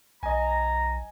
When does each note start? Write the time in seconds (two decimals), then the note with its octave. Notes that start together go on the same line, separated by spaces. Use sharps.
0.23 B1 D#5 G#5 A#5